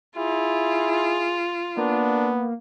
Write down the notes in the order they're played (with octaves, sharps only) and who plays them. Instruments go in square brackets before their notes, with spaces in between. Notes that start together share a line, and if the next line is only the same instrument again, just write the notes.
[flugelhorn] E4 [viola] F4 [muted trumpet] G#4
[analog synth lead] A#3 [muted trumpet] B3 [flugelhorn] D4